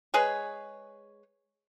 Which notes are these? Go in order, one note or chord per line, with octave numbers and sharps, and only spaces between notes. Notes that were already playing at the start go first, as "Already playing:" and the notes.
G#3 G#4 B4 C#5